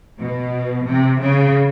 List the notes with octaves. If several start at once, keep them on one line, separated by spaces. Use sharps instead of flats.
B2
C3
C#3